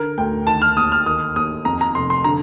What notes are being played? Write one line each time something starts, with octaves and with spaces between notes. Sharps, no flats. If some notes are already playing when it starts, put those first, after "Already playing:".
Already playing: D3 A#4
D2 G5
D#3 A5
F6
D#2 D#6
F6
D#3 D#6
D#2 D#6
F2 A#5
A#5
F1 C6
C6
D3 A#5